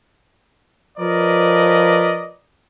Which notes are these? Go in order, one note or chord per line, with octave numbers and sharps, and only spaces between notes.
F3 A#4 B4 D5 D#5